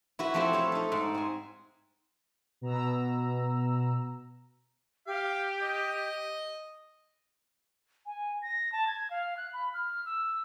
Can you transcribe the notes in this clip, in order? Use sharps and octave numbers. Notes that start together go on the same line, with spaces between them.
E4 F#4 B4
F3 A3 C4 E4 G4 A4
A4 C#5 F5
D#4 A4
G#2
C4 G#5
B2 A#5 E6
G4 F5
D#5
G#5
A#6
A5
G#6
F5
F#6
B5
F6
E6